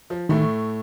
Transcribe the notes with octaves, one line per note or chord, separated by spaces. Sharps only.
F3
A2 D#3 A3